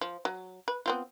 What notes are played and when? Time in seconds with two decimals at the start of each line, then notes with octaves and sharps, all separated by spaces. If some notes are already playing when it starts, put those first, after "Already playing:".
0.01 F3
0.25 F#3
0.68 B4
0.86 B3 C4 F4